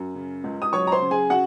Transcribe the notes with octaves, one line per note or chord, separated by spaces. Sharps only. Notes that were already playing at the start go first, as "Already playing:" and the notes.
Already playing: F#2
C#3
C#2
D#6
F#3 C#5 C#6
A#5
C5 C6
C#3
G#4 G#5
C#3 F#4 F#5